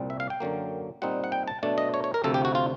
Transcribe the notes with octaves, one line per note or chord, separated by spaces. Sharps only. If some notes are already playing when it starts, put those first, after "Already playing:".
Already playing: C2 A#2 G3 C4
E5
F5
G5
F#2 D3 F#3 A#3
A#2 G3 C4 D#4 F#5
F#5
G5
A5
B2 F#3 A3 D4 A5
D#5
C#5
C#5
A#4
D2 C3 F3 A4
G4
F#4
F4